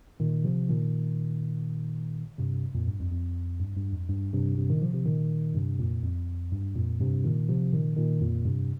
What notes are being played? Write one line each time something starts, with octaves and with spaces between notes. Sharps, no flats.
A#2 D#3
C3 F3
A#2 D#3
G2 C3
F2 A#2
G2
F2
F2
G2
G2
F2
G2
G2 C3
G2 C3
A#2 D#3
C3 F3
C3 F3
A#2 D#3
G2 C3
F2 A#2
F2
G2
F2 A#2
G2 C3
A#2 D#3
C3 F3
A#2 D#3
A#2 D#3
F2 A#2
G2 C3